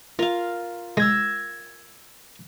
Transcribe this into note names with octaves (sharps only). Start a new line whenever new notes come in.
F4 A#4 F5
G#3 E6 G#6 A#6